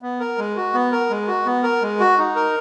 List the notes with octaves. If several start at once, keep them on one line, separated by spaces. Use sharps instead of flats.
B3
A#4
G#3
F#4
B3
A#4
G#3
F#4
B3
A#4
G#3
F#4
D#4
A#4